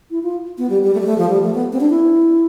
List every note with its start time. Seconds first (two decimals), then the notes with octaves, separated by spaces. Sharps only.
0.11 E4
0.23 F4
0.58 B3
0.70 G3
0.83 G3
0.95 A3
1.00 G3
1.06 A3
1.18 F3
1.30 G3
1.42 A3
1.54 B3
1.73 C4
1.81 D4
1.90 E4